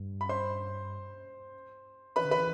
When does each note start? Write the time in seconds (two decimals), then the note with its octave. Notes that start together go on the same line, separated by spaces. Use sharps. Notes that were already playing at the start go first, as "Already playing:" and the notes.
Already playing: G2
0.21 B5
0.29 C5 C6
2.16 E3 B4 B5
2.24 D3
2.31 E3 B4 B5